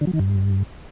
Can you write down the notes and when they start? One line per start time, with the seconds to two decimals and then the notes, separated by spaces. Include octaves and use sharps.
0.01 D3
0.07 F#3
0.13 D#3
0.19 G2